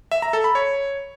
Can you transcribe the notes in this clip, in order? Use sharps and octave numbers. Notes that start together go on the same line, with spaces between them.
E5
A#5
A4
B5
C#5